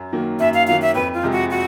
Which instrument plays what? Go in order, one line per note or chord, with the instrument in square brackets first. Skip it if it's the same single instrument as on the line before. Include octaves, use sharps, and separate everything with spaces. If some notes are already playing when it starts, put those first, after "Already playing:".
Already playing: [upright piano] F#2
D#3 F#3 A#3
[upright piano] F#2 [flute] E5
[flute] F5
[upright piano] D#3 F#3 A#3 [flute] F5
[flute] E5
[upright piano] F2 [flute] B4
[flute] F4
[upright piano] C3 F3 G#3
[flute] F#4
F#4